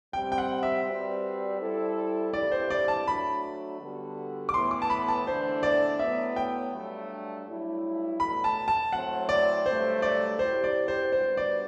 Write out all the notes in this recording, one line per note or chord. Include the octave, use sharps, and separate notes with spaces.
C3 G3 C4 G5
G5
F#5
E5
G3 C4 F#4 B4 D5
G3 C4 E4 A4
G2 E3 G3 C4 E4 D5
C5
D5
A5
F#3 A3 D4 F#4 B5
D3 G3 B3 F#4 A4
D6
A2 E3 B3 C6
D6
A5
B5
A5
E2 D3 A3 D4 C5
D5
A2 F#3 B3 E5
G5
G2 F#3 A3 D4
G2 F#3 A3 E4
E2 B2 F#3 A3 B5
A5
A5
A2 F#3 C4 F#5
D5
G2 D3 F#3 A3 C5
D5
F#3 C4 E4 G4 C5
D5
C5
G3 B3 D4 F#4 B4 C5
D5